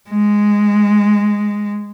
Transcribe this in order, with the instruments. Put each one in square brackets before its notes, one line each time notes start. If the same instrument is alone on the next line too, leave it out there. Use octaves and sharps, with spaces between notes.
[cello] G#3